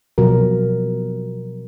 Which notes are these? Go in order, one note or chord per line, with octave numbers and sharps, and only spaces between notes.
B2 F3 F#3 A#4